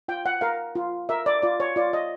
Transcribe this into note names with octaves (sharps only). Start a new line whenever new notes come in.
F4 G5
F#5
A#4 F5
F4
A#4 E5
D5
F4 D5
C#5
F4 D5
D#5